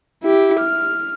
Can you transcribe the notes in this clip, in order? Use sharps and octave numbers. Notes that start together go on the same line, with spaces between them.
E4 G4
F6